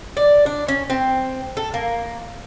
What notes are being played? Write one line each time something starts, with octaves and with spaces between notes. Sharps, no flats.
D5
D4
C#4
C4
A4
A#3